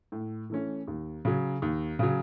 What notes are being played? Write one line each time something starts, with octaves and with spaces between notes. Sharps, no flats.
A2
E3 A3 C#4
D#2
C#3 F#3
D#2
C#3 F#3